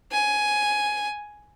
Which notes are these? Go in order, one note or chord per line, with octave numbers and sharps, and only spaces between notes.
G#5